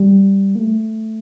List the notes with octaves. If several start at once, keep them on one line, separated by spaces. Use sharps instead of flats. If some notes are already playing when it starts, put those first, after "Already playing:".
Already playing: G3
A#3
A3